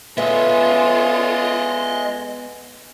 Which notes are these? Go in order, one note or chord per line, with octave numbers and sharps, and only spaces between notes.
G#3 B3 C#4 F4 A4 D#5 E5